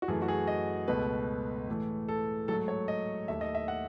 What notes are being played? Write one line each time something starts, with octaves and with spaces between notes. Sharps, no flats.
F#4
F#2 E3 A3 G#4
F#4
G#4
D#5
C#2 B2 A3 B4
A2 E3 A3
A4
G#2 F#3 A3 A4
C#5
D#5
D#2 D#3 A3 E5
D#5
E5
F#5